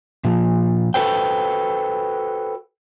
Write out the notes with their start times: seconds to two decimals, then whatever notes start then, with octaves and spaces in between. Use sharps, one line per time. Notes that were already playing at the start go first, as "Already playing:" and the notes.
0.24 A#2 F3
0.94 F#4 A4 B4 C5 G5